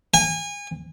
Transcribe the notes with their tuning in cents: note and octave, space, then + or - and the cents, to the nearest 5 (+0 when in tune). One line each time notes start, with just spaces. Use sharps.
G#5 -30